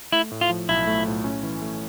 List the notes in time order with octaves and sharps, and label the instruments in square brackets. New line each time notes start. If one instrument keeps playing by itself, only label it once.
[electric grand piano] A3 [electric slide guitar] E4
[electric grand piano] A2
[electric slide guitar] F4
[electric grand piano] F3
[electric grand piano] B1 [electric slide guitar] E4
[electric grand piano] A3
A2
C#4
E3
A3